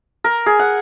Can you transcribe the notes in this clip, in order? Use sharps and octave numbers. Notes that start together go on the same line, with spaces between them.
A#4
G#4
F#5